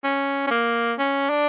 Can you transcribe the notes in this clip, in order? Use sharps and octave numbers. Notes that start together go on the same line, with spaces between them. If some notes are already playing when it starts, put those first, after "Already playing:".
C#4
C#4
A#3
C#4
D4